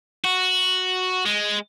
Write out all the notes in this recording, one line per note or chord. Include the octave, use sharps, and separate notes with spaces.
F#4
G#3